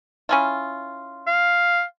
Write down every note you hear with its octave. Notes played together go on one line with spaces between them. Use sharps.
C#4 E4 F4
F5